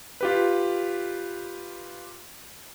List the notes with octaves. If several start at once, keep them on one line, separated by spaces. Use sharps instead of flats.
F4 G4 B4